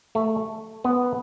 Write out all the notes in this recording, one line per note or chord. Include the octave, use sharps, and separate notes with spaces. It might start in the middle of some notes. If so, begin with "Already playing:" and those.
A3
B3